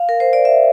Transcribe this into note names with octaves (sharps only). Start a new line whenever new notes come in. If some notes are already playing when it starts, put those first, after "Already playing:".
Already playing: F5
A#4
C5
D5
E5